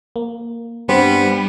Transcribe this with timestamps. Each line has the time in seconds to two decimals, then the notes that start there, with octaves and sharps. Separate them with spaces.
0.16 A#3
0.89 G2 G3 B3 C4 G4 C5